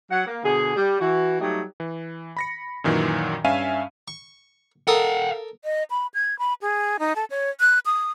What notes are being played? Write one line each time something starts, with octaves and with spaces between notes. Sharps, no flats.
F#3 F#4 F#5
A#3
B2 D3 G#4
G3
E3 F#4
F#3 G3 A3 D#4 G4
E3
B5 A#6 C#7
F#2 A#2 D#3 E3 F#3
G2 C#4 E5 F5 G#5 D#7
C#6
A4 A#4 F5 F#5 D#6
D#5
B5
G#6
B5
G#4
D#4
A4
C#5
F#6
D#6